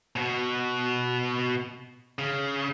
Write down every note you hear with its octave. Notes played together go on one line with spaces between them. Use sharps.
B2 F#4
C#3